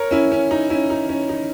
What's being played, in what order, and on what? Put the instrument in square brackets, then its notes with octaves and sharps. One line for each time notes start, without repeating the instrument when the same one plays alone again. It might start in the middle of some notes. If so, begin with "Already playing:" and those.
Already playing: [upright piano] A#4 C#5
C#4 E4
C#4
D#4
C#4 E4
D#4
C#4
D#4